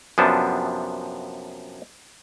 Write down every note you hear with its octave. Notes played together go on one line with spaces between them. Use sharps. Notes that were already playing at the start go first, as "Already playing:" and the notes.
F#2 C3 F3 B3 D4 A5